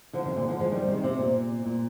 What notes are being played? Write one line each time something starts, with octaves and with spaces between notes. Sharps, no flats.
D3 F3
C3 D#3
A#2 D3
D3 F3
F3 G#3
D#3 G3
C3 D#3
C3
A#2
A#2